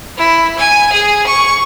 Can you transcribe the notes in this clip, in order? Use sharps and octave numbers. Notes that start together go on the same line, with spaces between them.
E4
G#5
G#4
C#6